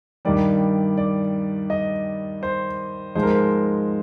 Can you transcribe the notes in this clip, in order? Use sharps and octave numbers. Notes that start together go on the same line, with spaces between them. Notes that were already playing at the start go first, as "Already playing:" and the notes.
G2 D#3 G3 D5
D5
D#5
C5
G#2 F3 G#3 C5
A#4
C5